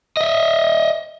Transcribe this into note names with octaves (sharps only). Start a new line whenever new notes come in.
D#5 E5